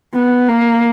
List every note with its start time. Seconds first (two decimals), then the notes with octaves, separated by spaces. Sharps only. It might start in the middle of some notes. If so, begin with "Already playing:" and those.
0.14 B3
0.49 A#3